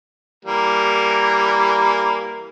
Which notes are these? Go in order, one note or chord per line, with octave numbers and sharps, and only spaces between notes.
E3 G3 A#3